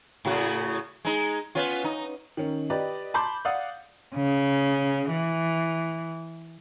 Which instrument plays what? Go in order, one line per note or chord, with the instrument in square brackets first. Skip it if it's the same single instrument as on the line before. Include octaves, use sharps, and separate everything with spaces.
[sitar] A2 C#3 F#4
G#3 D#4
B3 C#4 F4
D#4
[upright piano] D#3 C#4
G4 B4 D5 D#5
A5 B5 C6 D6 G6
D5 F5 F#5 D#6
[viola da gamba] C#3
E3